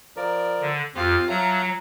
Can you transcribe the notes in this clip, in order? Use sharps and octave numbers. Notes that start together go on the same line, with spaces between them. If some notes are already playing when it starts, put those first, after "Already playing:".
F3 A#4 D5
D3
F2 F3 F4 G4
F#3 E5 F5 A5 A#5